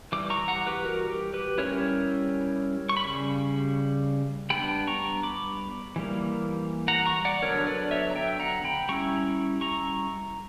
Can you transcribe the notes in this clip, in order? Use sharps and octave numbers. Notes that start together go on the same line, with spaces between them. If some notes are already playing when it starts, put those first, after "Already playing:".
E3 G3 D6
A#5 C#6
F#5 A#5
G4 B4
F#4 A#4
G4
G4 B4
G3 C#4 E4 A#4 C#5
C#6
B5
C#3 G3
G3 B3 D4 G5 B5
A#5 C#6
B5 D6
E3 G3 A#3
F#5 A#5
A#5 C#6
D5 F#5
D3 F#3 B3 D4 A#4 C#5
B4 D5
C#5 E5
A#5
E5 G5
F#5 A#5
G5 B5
G3 C#4 E4 A#5 C#6
A#5 C#6